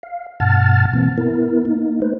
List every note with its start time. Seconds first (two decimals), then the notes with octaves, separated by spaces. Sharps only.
0.03 F5
0.40 G2 B2 F#5 A5 F6 A6
0.93 B2 E3 A#3 C4
1.18 B3 E4 A#4
1.65 A#3 D#4
2.02 A3 D#4 B4 C5